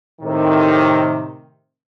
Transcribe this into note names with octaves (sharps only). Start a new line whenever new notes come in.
A2 C3 D#3